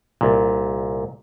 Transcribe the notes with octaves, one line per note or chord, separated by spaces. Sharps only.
C2 A#2